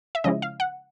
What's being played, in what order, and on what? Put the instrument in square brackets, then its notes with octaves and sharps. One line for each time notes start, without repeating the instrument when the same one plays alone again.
[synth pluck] E5
C#3 F3 G#3 C#4 E4 D#5
F5
F#5